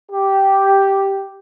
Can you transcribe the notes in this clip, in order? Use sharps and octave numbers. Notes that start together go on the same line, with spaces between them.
G4